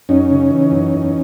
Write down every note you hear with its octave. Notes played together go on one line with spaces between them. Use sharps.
F#2 C#4 D#4
C#3
E3
F#2
E2